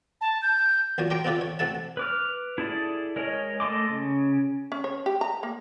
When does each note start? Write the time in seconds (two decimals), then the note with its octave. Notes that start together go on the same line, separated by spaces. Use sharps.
0.21 A5
0.42 G6
0.98 A1 A#2 F#3 C#5
1.10 G4 A#4 G5 A#5 C6
1.24 B3 C4 D4 F4 G4 A4
1.41 C#5
1.59 A1 C3 A3 A4 F#5 A5
1.97 B4 D6 F6
2.58 E4 G#4 A4 D5
3.16 G#3 A#4 C#5 D#5
3.60 A3 A4 D#5 C6 D6
3.90 C#3
4.72 C#4
4.84 C#5
5.06 G4
5.21 A#5
5.43 A#3